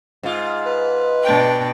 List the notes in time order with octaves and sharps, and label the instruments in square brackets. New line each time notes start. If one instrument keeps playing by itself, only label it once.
[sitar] G#2 F4
[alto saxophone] B4
[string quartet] B2 D4 G5